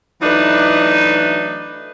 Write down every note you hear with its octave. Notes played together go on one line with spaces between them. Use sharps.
E3 F#3 A3 D4 D#4 B4